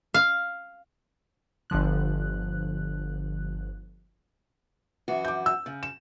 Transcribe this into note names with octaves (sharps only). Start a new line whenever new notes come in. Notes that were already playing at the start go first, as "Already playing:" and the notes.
F5
G1 D3 F3 F#6
F#2 E3 F#4
D6 G6
E6
C#3
E7